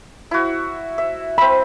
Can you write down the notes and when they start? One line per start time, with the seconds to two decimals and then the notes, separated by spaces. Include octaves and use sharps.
0.31 E4 F#4
0.98 E5
1.38 C4 E5 B5